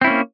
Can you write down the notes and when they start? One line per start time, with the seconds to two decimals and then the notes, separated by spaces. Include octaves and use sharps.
0.01 C4
0.04 E4
0.07 C#4
0.10 A#3